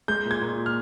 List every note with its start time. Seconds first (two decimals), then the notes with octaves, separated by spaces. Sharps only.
0.08 G#3 G6
0.25 A#2
0.31 G#6
0.42 A#2
0.66 F6